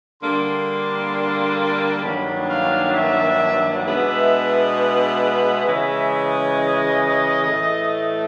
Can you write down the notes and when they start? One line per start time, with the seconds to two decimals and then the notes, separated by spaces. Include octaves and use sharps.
0.22 D3 G3 A#3 D4 C6
2.03 G2 D#3 F#3 A#3 D4 B5
2.49 F5
2.94 E5
3.85 B2 G#3 B3 D4 E5
4.74 E5
5.64 C#3 E3 G#3
6.55 D#5
7.46 A2 E3 A3